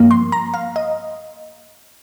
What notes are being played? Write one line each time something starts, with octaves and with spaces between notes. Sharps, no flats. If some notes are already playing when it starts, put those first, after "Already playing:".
Already playing: G2 F3 A#3
C6
A#5
F5
D#5